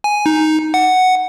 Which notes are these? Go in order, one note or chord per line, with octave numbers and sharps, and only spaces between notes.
G#5
D#4
F#5